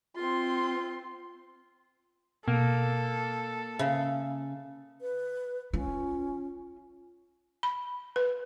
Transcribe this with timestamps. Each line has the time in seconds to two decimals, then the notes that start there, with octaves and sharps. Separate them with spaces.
0.16 C4 F4 C6
2.48 B2 A#3 A4
3.79 C#3 E5
5.01 B4
5.73 C#4 F4
7.63 B5
8.16 B4